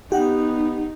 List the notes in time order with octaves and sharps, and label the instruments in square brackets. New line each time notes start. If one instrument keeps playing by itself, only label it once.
[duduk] B3 [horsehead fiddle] D#4 [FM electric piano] G4 F#5